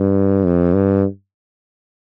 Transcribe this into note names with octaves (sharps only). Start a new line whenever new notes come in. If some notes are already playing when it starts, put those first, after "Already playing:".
Already playing: G2
F2
G2